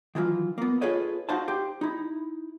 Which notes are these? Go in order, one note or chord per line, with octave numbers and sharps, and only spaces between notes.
D#3 E3 F#3 F4
A#3 B3
F4 G#4 A4 B4 C#5 D#5
D#4 F#4 C5 F5 F#5 A5
G4 C5
D#4 E4